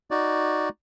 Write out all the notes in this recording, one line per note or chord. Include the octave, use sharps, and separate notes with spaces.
D#4 F#4 D5